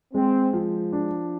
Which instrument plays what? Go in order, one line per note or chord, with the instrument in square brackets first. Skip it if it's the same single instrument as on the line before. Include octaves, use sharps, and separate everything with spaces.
[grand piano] G#3 [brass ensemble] C4
[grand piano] F3
D4